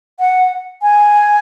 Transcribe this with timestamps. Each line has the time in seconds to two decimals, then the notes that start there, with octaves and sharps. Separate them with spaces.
0.20 F#5
0.82 G#5